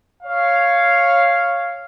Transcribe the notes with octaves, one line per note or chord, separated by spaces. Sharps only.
C#5 F5